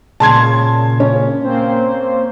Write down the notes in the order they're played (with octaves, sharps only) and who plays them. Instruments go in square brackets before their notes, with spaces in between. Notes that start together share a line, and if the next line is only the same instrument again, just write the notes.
[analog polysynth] A#2 C#3 [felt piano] A5 C6 G#6
[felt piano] C#4
[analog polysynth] A#3 C4 C5